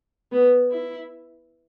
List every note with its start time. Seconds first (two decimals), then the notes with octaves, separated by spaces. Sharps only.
0.32 B3
0.71 E4